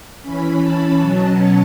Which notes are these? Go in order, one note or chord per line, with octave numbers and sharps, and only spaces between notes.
E3 C#4 B5
A5
B2 F#3 C#4 A5